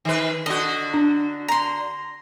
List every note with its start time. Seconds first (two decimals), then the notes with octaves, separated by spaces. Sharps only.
0.05 D#3 B4
0.46 D3 F#4 D#5
0.94 D4
1.48 A#5 C6